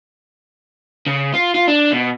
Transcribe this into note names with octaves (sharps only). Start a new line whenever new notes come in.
C#3
F4
F4
D4
B2